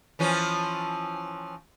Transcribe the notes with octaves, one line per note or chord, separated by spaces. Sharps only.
E3 F3 C#4